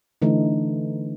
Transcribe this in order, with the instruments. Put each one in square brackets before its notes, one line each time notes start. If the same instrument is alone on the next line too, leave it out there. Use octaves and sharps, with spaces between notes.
[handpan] D3 E3 A3 D#4